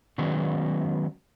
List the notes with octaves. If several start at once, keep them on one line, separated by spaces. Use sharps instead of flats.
D#3 F#3 G#3 B3 C#4